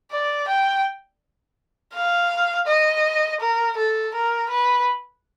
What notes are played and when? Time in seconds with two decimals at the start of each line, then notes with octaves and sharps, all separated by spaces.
0.12 D5
0.48 G5
1.94 F5
2.67 D#5
3.41 A#4
3.77 A4
4.14 A#4
4.50 B4